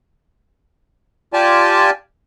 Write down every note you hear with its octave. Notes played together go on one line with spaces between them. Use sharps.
F4 G4 D5 G#5 A5